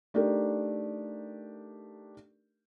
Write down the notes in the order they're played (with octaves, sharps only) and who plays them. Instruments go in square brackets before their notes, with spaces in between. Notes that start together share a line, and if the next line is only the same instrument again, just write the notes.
[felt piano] A3 D4 D#4 G4 A4 A#4